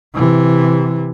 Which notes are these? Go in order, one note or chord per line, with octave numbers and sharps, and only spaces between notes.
C3 E3